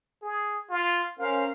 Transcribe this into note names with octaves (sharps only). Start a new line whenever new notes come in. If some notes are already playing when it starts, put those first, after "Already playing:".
G#4
F4
C#4 A#4 C5 F5